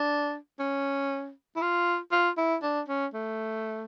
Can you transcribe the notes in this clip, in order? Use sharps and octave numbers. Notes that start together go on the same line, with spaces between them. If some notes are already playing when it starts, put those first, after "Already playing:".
Already playing: D4
C#4
E4
F4
F4
E4
D4
C#4
A3